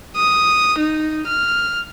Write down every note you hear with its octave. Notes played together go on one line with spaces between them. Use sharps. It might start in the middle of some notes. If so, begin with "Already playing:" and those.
D#6
D#4
F6